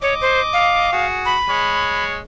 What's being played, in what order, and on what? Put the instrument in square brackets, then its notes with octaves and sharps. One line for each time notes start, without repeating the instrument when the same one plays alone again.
[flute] C#5 [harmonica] D#5 D6
[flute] C5
F5
[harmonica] F#4 G#4
[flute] B5
[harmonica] G#3 C#5